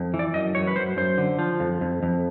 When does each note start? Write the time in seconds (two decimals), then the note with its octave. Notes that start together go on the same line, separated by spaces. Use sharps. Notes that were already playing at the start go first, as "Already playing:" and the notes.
Already playing: F2
0.14 E3
0.19 D5
0.34 F#2 D#5
0.55 F#2 C#5
0.67 B4
0.76 F#2 C5
0.97 F#2 C5
1.18 D3
1.39 F3
1.60 F2
1.81 F2
2.03 F2